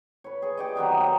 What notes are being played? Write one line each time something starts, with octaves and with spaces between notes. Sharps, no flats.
B4 C#5
G#4 C#6
G4 D5 D#5
C3 D#3 F#3 B3
A#3 D#4 B4